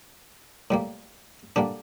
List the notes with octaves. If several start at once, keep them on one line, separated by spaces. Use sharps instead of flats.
A2 G3 A#3
D3 G3 A#3 D4